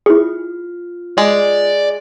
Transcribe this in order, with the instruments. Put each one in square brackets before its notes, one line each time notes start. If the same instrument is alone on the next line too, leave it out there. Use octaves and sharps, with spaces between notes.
[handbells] E4 G#4 [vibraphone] F4
[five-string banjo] G#3 [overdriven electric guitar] D5